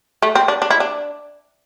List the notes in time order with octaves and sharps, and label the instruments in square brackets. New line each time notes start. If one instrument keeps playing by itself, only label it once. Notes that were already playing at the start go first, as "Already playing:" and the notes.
[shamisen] A3
C4
D4
D4
E4
D4